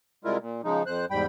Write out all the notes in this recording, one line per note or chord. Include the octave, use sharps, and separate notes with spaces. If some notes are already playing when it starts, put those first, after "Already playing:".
C3 G3 G#3 E4 F4 A#4
A#2
C#3 F3 G#3 D#4
F2 C5 F#6
E2 G#2 G3 G5 B5